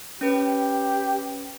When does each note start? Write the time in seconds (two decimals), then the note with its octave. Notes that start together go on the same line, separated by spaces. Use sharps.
0.21 C#4 G4 B4